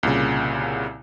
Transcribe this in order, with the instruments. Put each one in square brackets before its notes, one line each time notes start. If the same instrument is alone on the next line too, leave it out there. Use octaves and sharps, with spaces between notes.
[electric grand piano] C2 A#2 C#3